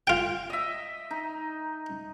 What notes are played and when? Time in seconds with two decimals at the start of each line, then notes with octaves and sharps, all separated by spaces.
0.07 F4 G5
0.50 D#5 E5
1.11 D#4